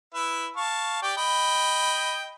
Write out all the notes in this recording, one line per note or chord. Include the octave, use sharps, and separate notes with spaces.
E4 B4 E5
F5 A5 C#6
G4 D5 G5
D#5 G5 B5